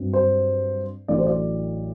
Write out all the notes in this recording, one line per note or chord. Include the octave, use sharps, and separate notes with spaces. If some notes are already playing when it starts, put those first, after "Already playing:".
Already playing: G2 F#3 C4
C5
A1 A2 F#3 A3 D4 D5
C5
D5